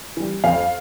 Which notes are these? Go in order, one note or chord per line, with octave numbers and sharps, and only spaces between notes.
E3 G3
F2 F5